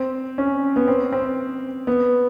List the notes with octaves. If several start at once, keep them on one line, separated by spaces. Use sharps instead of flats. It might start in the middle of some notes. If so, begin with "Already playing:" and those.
Already playing: C4
C#4
B3
C4
C4
B3